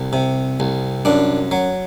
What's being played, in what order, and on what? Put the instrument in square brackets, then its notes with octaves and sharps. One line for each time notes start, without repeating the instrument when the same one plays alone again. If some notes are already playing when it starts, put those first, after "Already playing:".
Already playing: [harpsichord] C2
C3
C2
F#2 D4
F#3